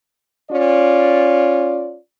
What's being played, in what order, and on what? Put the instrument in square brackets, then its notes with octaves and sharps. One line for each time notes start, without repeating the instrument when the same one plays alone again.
[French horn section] C#4 F4 D5